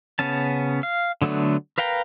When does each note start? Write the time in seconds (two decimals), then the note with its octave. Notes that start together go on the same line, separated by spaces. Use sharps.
0.19 C#3 B3 C#4 A5
0.83 F5
1.22 D3 F#3 A3 B3 D4
1.78 A#4 B4 F5 G5 A#5